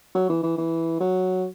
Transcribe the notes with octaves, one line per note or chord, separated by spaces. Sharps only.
F#3
E3
E3
E3
F#3